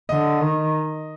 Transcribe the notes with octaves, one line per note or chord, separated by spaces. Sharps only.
D3 D#5
D#3